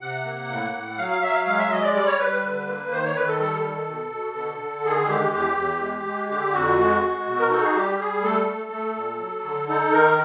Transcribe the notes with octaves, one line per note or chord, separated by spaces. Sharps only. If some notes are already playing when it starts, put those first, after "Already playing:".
C3 F#5
A#3
A2
A2
F#3 F5
F5
F#3 E5
F5
G#3 F5
E5
G#3 D#5
D5
G3 D5
C#5
G3 B4
B4
D3
A#3
D#3 C5
C#5
D#3 B4
A4
G3 A4
D#3
B2
B2
D3
D3
D#3 G#4
G#3 G4
E2 G4
E2
G#3
G#3
D3 G4
F2 F#4
G#3 F#4
G#3
B2
A#4
D#4 A4
G#4
G3 G4
G3 G#4
A3 A4
A3
A3
A#2
F#3
D3
D#4 A4
D#3 A#4